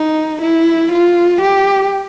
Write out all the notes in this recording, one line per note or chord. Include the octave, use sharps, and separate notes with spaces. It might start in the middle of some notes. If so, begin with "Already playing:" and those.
Already playing: D#4
E4
F4
G4